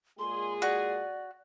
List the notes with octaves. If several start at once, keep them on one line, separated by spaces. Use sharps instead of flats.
A#2 G#3 G#4 C6
F#4 D5